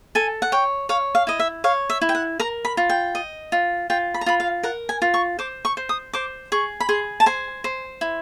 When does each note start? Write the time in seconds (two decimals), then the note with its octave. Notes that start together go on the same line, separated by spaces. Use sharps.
0.15 A4 G#5
0.42 F#5
0.52 C#5 G5
0.89 C#5 F5
1.15 F5
1.27 E4 D#5
1.39 E5
1.64 C#5 F5
1.90 E5
2.01 E4
2.09 G5
2.15 F#5
2.40 A#4 A#5
2.65 B5
2.77 F4
2.89 G5
3.15 D#5
3.52 F4
3.90 F4 G5
4.14 B5
4.21 A#5
4.26 F4 B5
4.40 F5
4.63 A#4 F#5
4.89 G#5
5.02 F4
5.14 C#6
5.39 C5 D6
5.65 C#6
5.77 C5
5.89 D#6
6.13 C5 D6
6.52 G#4 C#6
6.80 B5
6.89 G#4 C6
7.20 A5
7.26 C5 G#5
7.64 C5
8.01 E4